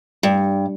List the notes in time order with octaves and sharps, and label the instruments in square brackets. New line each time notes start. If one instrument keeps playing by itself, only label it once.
[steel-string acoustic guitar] G2